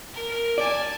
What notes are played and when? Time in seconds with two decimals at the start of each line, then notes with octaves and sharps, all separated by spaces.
0.13 A#4
0.58 D5 G#5 A5